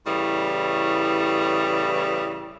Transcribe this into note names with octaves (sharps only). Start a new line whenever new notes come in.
A2 C#3 E3 G3